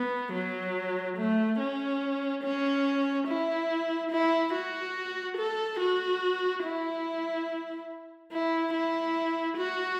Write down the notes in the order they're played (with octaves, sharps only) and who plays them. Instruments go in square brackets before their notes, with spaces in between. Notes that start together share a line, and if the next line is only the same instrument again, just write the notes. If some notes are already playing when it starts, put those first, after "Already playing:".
Already playing: [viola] B3
F#3
A3
C#4
C#4
E4
E4
F#4
A4
F#4
E4
E4
E4
F#4